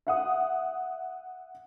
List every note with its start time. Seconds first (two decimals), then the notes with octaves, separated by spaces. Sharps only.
0.07 E5 F#5 D#6